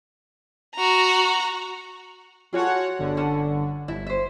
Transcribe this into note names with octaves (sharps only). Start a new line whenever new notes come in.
F#4 A#5
F4 F#4 G#4 A4 C#5 F#5
G1 D3
C#4 F#5 A5
G1 E4 E5
C5 E5